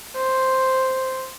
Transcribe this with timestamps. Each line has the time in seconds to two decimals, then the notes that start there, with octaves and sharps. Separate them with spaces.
0.16 C5